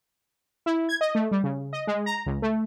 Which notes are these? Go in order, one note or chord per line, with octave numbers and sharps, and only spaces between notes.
E4
G#6
D#5
A3
G3
C#3
D#5
G#3
A#5
C#2
A3